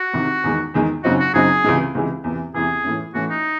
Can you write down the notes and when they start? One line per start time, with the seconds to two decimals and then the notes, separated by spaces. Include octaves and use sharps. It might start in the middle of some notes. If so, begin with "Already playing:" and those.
Already playing: F#4
0.13 C2 C3 D#3
0.44 E2 D#3 G#3
0.74 E2 D#3 G#3
1.03 F#2 C#3 F#3 C4 D#4 F#4
1.19 F#4
1.33 F#2 C#3 F#3 C4 D#4 G#4
1.64 C#2 C3 E3 G#3
1.95 C#2 C3 E3 G#3
2.24 E2 C3 E3
2.54 E2 C3 E3 G#4
2.84 A2 E3 A3 C#4
3.14 A2 E3 A3 C#4 F#4
3.30 D#4